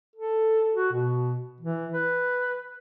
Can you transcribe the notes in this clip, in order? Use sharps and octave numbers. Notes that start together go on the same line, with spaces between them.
A4
F#4
B2
E3
B4